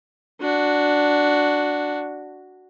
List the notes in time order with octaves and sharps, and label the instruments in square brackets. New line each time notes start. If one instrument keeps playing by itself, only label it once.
[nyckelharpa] D4 F#4